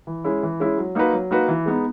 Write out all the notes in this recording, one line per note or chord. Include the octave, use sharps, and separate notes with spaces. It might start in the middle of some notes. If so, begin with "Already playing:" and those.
E3
G#3 C#4 E4
E3
G#3 C#4 E4
F#3
A#3 D#4 F#4 B4
F#3
A#3 D#4 F#4 B4
E3
G#3 B3 D#4